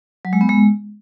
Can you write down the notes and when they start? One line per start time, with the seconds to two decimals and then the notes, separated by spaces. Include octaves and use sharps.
0.25 F#3
0.33 G#3
0.41 B3
0.49 G#3